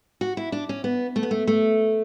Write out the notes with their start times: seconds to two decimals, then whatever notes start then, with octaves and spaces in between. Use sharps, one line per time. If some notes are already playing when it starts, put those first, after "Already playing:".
0.21 F#4
0.37 E4
0.52 D4
0.69 C#4
0.84 B3
1.16 A3
1.23 B3
1.31 A3
1.47 A3